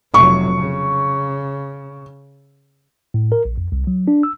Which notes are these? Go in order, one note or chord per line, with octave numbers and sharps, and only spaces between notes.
F1 F#3 C#6
C#3
A2
A#4
A#1
F2
C2
F#3
D4
E6